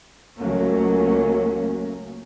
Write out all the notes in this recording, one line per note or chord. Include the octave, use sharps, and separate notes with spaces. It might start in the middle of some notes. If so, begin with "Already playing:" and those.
C#2 F#3 A3 A#3 C#4